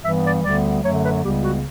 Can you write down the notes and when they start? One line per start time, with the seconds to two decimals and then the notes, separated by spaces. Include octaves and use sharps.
0.02 G2 E3 G3 B3 E5
0.22 D5
0.43 D2 D3 G3 B3 D5
0.82 F#2 D3 F#3 A3 C#5
1.03 B4
1.22 C#2 C#3 G3 B3 G4
1.43 F#4